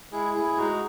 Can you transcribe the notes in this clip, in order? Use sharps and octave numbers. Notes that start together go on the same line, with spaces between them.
G#3 E4 G#4
A2 E4 G#4
G#3 D#4 F#4